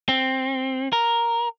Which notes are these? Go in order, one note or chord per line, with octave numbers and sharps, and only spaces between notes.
C4
A#4